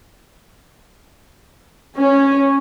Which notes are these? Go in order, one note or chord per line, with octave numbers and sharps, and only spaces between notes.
C#4